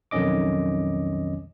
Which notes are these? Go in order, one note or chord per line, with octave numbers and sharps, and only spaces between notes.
B1 F2 D#3 C#4 D#5 D6